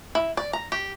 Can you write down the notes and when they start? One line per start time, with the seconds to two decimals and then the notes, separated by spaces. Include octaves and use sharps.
0.15 E4
0.37 D5
0.53 A#5
0.72 G4